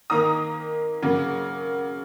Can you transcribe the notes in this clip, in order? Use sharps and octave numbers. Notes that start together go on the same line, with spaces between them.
D#3 A#3 A#5 D#6
C#3 F#3 A#3